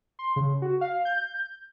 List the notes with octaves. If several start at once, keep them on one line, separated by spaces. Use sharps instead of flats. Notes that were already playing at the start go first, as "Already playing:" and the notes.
C6
C#3
F#4
F5
G6